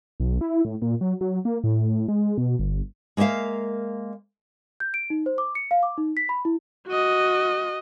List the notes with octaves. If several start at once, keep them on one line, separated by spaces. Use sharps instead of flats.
B1
E4
A2
A#2
F#3
F#3
A#3
A2
G#3
B2
G1
G#3 A#3 A#4 E5 F5
G6
D7
D#4
C5
D6
C#7
F5
D6
D#4
B6
B5
E4
F#4 D#5